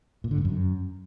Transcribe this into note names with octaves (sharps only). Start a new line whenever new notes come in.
A#2
D3
G2
F#2